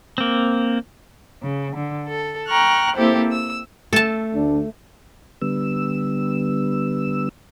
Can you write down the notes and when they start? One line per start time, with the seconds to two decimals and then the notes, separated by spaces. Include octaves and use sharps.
0.18 A#3 C4
1.42 C#3
1.75 D3
2.07 A4
2.46 G5 A#5 C#6 F6 F#6
2.96 A#3 C4 E4 G4 A4 C5
3.31 E6
3.93 A3 A4 A5
4.34 D2 D4
5.42 D3 G3 B3 E6